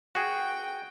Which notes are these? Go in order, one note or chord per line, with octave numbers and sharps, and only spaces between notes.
F#4 G#4 G5